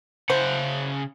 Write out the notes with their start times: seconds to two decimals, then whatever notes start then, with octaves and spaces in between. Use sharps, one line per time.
0.29 C#3 E4 C5 F#5